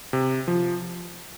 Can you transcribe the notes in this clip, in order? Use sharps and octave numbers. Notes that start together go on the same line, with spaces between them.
C3
F3